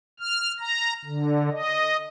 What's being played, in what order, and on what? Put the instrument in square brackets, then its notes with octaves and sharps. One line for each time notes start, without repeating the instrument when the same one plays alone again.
[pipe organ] F6
A#5
D3
D#5